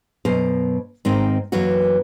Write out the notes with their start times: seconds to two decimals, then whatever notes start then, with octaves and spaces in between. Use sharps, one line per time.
0.25 F#2 B2 A#4 C5
1.05 G#2 D#3 C4 A#4 C5
1.52 F#2 E3 A#3 F#4